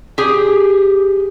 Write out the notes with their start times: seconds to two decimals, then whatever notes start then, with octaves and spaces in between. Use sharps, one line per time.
0.18 G4 G#4